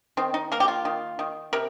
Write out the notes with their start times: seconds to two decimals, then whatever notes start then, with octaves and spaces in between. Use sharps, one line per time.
0.17 D#3 C4
0.34 D#4
0.52 A#3 A#4
0.60 G4
0.68 F4
0.85 D#3
1.19 D#3
1.53 C3 A#4